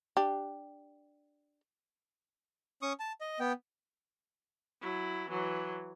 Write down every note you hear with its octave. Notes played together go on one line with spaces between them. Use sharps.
D4 G4
C#4 C#6 D#6
A5
D#5
B3 G5
F#3 E4
E3 F#3